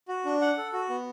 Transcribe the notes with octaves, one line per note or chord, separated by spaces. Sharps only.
F#4
D4
F#5
A4
F#4
B3